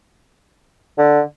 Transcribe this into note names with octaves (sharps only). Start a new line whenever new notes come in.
D3